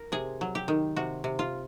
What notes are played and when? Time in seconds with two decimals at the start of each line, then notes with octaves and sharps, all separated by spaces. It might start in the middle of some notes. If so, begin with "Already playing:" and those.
Already playing: A#4
0.12 C3 G#4
0.41 F#3
0.55 G4
0.68 D#3
0.96 C3 F#4
1.24 C3
1.39 F4